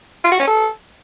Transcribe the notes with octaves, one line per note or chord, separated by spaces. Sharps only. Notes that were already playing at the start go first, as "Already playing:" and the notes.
F4
F#4
C#4
A4